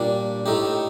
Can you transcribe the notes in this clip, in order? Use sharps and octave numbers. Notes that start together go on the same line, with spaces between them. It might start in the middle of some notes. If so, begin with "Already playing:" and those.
Already playing: A#2 G3 D4
A2 A3 D#4 G4